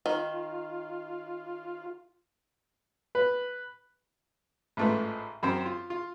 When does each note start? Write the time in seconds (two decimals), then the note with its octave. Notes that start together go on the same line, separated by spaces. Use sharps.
0.06 D#3 F4
3.15 B4
4.77 A1 G#2 A3 F4 B4
5.43 F#2 C4 C5
5.66 F4
5.90 F4